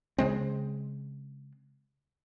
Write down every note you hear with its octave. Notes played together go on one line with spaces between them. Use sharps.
C#3 G#3 C4